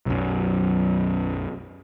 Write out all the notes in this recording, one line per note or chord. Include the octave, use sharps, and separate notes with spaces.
B1 F#2